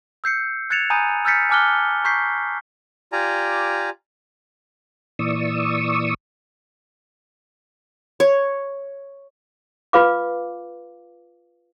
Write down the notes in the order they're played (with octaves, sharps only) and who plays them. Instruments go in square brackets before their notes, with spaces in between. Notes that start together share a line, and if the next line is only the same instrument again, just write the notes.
[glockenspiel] E6 G6 C7 C#7
F#6 G#6 A6 C#7 E7 F7
G#5 A#5 B5 D#6 G6 D#7
E6 F6 G6 A6 B6 C#7
G#5 A5 D6 F6 F#6 G7
A#5 C#6 G6 B6 C7
[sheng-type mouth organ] F4 G4 D5 G#5 A#5
[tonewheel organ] A#2 E3 D5 C#6 D#6 E6
[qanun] C#5
[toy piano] F4 B4 F5 D6